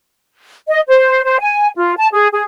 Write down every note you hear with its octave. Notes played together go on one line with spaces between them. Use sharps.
D#5
C5
C5
G#5
F4
A5
G#4
G#4